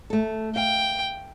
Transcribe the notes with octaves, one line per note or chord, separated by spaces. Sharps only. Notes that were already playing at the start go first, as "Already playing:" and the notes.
A3 A4
F5 G5